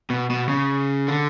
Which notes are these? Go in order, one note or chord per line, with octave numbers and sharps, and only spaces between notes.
B2
B2
C#3
D3